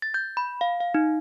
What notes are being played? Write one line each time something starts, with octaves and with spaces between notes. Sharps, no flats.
A6
G6
B5
F5
F5
D#4